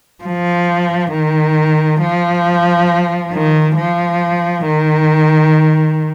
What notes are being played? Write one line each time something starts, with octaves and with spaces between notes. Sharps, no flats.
F3
D#3
F3
D#3
F3
D#3